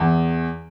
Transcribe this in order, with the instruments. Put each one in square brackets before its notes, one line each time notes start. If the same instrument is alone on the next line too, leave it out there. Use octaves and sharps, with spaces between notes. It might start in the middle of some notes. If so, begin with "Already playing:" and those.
Already playing: [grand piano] E2